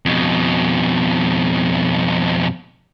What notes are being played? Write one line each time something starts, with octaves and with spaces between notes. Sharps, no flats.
F2 B2